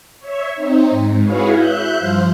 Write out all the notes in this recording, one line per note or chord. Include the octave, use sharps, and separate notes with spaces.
C#5 E5
C4 D#4
G#2
E4 F#4 G#4 B4 C#5 F5
E5 F#6 G6
G2 F3 C5 F5